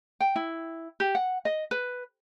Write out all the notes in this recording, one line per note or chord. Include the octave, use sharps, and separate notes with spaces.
G5
E4
G4
F#5
D#5
B4